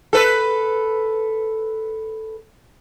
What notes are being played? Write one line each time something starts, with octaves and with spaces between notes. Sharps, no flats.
A4 B4